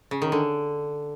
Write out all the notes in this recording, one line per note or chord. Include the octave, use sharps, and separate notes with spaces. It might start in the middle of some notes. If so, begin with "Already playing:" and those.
C#3
D#3
D3